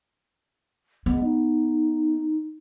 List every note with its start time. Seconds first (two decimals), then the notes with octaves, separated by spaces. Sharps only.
1.06 G#3 B3
1.23 D#4